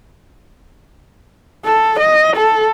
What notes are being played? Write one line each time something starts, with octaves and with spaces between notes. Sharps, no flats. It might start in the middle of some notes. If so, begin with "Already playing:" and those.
A4
D#5
A4